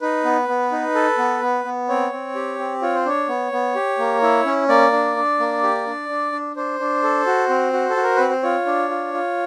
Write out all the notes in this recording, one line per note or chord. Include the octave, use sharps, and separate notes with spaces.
D#4 B4
B3
B3
D#4
A4
B3
B3
B3
C4 C#5
C4
G4
C4
F4 C#5
C5
D4 C#5
B3
B3
G4
A#3
E4
C#4
A#3 D5
D4
D4
A#3
G4
D4
D4
D4
D4 C5
D4
A4
F#4
C4
F#4
A4
F#4
A#4
C4 B4
C5
F4 C#5
D4
F4
F4